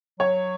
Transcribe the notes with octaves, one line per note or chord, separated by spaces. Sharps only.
F#3 C#5